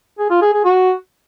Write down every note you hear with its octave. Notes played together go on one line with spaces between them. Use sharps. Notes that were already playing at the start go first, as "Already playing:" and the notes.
G#4
F4
G#4
G#4
F#4